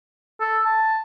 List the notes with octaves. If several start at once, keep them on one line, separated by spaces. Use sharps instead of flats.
A4
A5